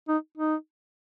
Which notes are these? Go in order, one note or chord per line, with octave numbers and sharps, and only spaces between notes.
D#4
D#4